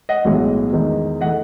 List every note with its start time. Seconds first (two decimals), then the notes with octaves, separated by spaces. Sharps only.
0.09 D#5 F#5
0.25 B1 A2 E3 G#3 B3
0.73 E2 D#3 G#3 D#4
1.21 E3 A3 D#5 F#5